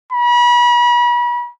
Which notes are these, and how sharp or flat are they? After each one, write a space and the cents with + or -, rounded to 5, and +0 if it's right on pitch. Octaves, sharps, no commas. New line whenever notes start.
B5 -35